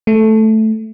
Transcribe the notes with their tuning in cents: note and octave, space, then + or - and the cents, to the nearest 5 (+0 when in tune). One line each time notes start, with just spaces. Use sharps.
A3 -5